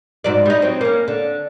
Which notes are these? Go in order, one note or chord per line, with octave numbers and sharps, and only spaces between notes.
G#2 F#3 D5
G3 D#4
F#3 C4
A#3 C#4
D3